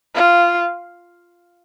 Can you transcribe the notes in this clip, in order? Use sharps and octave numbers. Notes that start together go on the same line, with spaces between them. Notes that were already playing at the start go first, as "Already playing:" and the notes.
F4